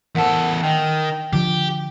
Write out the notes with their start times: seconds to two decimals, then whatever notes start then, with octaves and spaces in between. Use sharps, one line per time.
0.15 E2 A4 A#4 F#5 A5
0.63 D#3 G5
1.33 D3 F3 G4